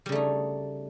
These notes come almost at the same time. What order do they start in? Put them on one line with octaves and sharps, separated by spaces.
G3 C#3 A3 D#4